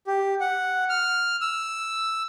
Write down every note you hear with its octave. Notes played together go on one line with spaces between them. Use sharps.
G4
F#5
F6
E6